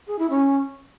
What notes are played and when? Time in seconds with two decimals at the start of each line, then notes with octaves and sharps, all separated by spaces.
0.07 G#4
0.19 E4
0.30 C#4